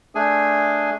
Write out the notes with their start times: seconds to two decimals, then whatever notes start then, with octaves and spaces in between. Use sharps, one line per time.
0.15 A3 D4 G#4 G#5